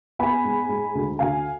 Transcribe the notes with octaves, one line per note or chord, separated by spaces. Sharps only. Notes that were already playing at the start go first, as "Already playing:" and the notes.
B3 G#5 B5
G#2
G#2
D2
D2 F5 G#5